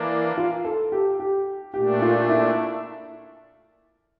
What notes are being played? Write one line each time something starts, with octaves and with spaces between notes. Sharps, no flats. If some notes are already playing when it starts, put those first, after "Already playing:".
Already playing: E3 A#3 D4
F4
A4
G4
G4
A#2 A3 D4 G4
F4
E4